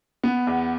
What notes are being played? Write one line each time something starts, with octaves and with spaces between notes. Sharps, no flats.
B3
E2